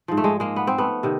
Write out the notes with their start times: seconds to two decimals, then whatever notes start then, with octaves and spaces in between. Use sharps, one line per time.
0.08 G#2 F3
0.17 A3
0.24 G#3
0.40 G#3 A#3
0.56 B3
0.67 C4
0.78 A3 B3
1.03 C3 D#3